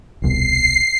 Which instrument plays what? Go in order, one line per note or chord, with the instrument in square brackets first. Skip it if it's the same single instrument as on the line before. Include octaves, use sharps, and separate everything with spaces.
[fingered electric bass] D#1 C2 B2 [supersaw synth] C7